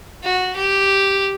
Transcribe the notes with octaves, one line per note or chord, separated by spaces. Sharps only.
F#4
G4